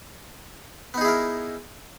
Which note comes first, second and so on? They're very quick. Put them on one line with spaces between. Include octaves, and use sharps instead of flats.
B3 D#4 G#4 E4 A#4